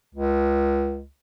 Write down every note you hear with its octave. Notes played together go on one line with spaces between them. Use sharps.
C#2